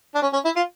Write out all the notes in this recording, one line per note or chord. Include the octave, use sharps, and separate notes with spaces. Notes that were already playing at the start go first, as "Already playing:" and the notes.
D4
C#4
C#4
E4
F4